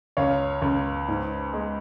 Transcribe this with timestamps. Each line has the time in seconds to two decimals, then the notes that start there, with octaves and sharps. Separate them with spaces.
0.17 C#2 C#5 F5
0.62 C#2
1.08 G#2
1.53 G#3